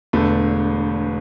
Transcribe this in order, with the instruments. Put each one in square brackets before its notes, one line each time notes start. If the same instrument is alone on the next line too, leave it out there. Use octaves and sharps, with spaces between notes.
[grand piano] E1 E2 D3 A3